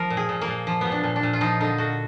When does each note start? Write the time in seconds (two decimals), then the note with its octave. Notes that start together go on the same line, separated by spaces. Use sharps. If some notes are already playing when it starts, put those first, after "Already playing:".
Already playing: F3 A#4
0.10 A#2
0.17 G#4
0.29 A#2
0.42 A#3
0.48 A#2
0.67 F3
0.81 A#2 B3
0.92 D4
1.03 A#2
1.16 D4
1.23 A#2
1.33 F4
1.41 F3 D#4
1.61 D3 D#4
1.78 D3 F#4